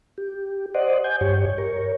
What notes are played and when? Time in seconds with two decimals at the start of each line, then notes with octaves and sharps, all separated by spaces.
0.18 G4
0.74 C5 D5 D#5 F#5
1.04 G#5 G6
1.21 G2 G4 C#5
1.58 A#4 C#5